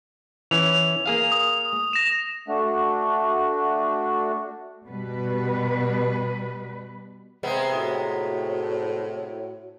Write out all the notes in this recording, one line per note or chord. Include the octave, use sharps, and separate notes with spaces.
E3 C#4 F7
A#3 G#4 F5
D#6
A#6 E7
A3 D4 F#4
B2 G3 B4
C3 G#3 B3
A2 F#4 C#5 F#5